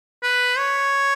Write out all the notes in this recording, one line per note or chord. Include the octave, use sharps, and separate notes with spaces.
B4
C#5